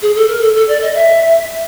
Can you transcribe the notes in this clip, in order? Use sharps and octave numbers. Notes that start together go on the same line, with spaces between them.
G#4
A4
A#4
A4
A4
D5
D#5
E5